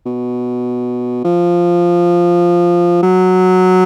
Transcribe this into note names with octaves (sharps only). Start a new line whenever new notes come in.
B2
F3
F#3